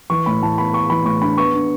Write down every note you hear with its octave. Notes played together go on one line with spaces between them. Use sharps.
E3 C#6
A2 B5
A2 A5
B3 B5
B3 C#6
E3 B5
A2 C#6
D4 B5
B3 C#6
D4